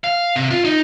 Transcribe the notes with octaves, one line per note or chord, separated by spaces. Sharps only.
F5
C3
F4
D#4